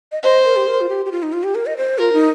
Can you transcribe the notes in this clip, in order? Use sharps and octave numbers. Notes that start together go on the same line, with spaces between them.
D#5
C5 D#5
A#4
G4
A#4
F4
G4
G4
F4
D#4
F4
G4
A#4
D#5
C5
F4 A#4
D#4